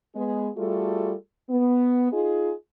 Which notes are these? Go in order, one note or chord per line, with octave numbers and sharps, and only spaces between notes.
G#3 B3 G#4
G3 A3 F4 F#4 G#4 A4
B3
D#4 F4 G#4